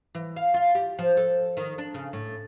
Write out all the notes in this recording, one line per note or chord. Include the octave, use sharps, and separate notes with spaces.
E3
F5
F4
G4
F3
A4
D#3
D4
C#3
A2